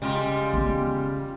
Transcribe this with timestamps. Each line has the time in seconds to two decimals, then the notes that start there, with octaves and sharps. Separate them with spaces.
0.02 C#3 G3 G#3 F4 G4
0.53 B3